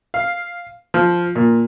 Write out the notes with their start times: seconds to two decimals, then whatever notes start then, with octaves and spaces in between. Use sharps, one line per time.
0.14 F5
0.94 F3
1.36 A#2